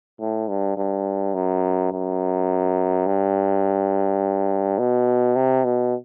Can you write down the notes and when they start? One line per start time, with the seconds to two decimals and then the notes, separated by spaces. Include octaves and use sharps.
0.20 A2
0.49 G2
0.77 G2
1.35 F#2
1.92 F#2
3.06 G2
4.78 B2
5.36 C3
5.64 B2